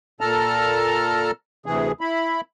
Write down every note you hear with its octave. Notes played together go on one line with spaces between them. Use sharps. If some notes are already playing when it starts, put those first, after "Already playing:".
A#2 A4 A5 A#5 F6
D2 C3 E3 G#4
E4 B5